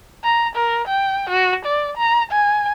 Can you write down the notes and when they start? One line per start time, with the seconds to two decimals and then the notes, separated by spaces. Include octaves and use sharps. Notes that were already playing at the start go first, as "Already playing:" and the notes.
0.24 A#5
0.56 A#4
0.88 G5
1.30 F#4
1.65 D5
1.97 A#5
2.31 G#5